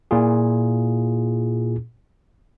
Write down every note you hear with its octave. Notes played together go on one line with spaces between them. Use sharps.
A#2 E4 F4 G#4